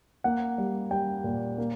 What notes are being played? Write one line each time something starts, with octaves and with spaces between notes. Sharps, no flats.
A#3 F#5
G3
G3 G5
A#2
A#3